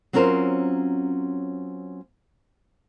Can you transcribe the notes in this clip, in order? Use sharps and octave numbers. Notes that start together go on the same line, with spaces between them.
F#3 C4 C#4 F4 A#4 C5